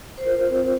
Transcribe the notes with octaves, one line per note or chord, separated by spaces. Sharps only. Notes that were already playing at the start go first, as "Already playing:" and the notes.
C5
F4 A#4
C4